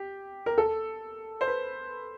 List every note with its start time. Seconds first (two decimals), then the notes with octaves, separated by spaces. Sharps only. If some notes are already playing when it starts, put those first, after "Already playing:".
Already playing: G4
0.46 A#4
0.58 A4
1.41 C5
1.47 B4